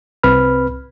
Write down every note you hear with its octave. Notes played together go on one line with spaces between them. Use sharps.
C2 C4 B4 B5 F6